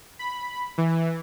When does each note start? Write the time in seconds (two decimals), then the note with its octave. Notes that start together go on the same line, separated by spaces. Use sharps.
0.19 B5
0.78 E3